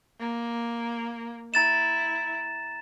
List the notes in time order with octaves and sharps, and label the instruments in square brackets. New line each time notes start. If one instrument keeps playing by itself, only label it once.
[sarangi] A#3
[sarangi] E4 [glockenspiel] A#5 A6 E7